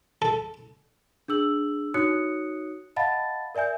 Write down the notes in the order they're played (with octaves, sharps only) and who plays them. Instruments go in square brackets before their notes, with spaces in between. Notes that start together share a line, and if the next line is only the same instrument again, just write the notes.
[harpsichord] A4
[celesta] D4 G#4 E6 F#7
D#4 F#4 C#5 D#6 F#6 C#7
D#5 F5 F#5 A5 B5 A6
A#4 D5 E5 G#5 G6